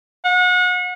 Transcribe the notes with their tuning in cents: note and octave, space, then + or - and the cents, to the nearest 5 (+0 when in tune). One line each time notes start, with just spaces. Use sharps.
F#5 -35